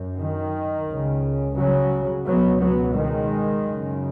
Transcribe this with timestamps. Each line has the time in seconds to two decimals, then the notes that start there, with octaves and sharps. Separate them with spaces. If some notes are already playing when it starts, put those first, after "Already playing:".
Already playing: F#2
0.18 D#3
0.87 C#2 C#3
1.56 C#3 F#3
2.26 C#2 B2 F#3 B3
2.60 F#3 B3
2.95 D#3 G#3
3.65 F#2 C#3